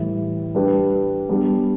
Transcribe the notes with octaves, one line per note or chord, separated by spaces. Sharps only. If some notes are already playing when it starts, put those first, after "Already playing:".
Already playing: A2 E3 G3
G3 D4 G4 B4
G3 B3 D4